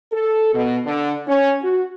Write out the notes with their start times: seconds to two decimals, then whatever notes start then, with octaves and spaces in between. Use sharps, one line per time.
0.12 A4
0.54 B2
0.85 D3
1.27 C#4
1.62 F#4